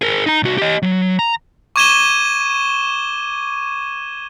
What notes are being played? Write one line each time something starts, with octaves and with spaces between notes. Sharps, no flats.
G#4 A#4
D#4 A#5
C2 F#4
G4 D#5
F#3
A#5
C#6 D6 G#6 D#7 E7 G7